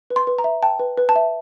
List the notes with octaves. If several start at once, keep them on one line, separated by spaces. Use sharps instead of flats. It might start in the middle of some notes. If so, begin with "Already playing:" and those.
B4
C6
B4
A#5
E5
G5 A5
B4
B4
A5
E5